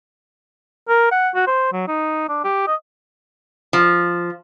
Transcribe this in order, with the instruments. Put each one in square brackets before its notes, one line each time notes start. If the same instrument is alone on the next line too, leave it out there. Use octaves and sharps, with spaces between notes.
[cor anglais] A#4
F#5
F#4
C5
F#3
D#4
D4
G4
D#5
[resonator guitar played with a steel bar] F3